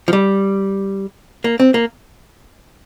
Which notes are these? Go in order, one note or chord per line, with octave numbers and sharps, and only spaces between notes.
F3
G3
A#3
C4
A#3